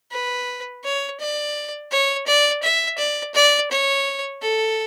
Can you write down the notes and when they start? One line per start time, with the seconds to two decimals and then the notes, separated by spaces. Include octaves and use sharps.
0.11 B4
0.84 C#5
1.20 D5
1.91 C#5
2.27 D5
2.63 E5
2.98 D5
3.34 D5
3.71 C#5
4.42 A4